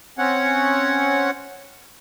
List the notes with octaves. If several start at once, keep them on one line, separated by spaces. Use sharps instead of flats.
C4 C#4 C#5 F#5